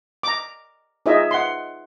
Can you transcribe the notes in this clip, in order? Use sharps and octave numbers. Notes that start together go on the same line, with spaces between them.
A#5 D6
D#4 F4 G#4 C#5 D#5 E5
F#5 C6